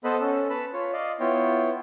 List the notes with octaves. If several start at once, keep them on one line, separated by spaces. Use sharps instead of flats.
B3 A4 B4 C5 D#5 B5
C#4 A4
B4 A5 B5
F4 C#5
D5 D#5 F5
B3 E4 F4 C#5 G5